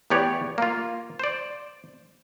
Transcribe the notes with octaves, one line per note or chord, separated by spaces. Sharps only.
E2 B3 G4 C#5 D5
A#3 F4
C5 D5